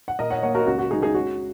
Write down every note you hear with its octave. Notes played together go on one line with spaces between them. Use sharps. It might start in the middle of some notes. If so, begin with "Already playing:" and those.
F#5
A#2 A#4 D#5
C#5 F#5
A#3 C#5 F#5
F#4 A#4
C#2 F#4
F#4
G#3 D#4 G#4
D#4 G#4
C#4 F#4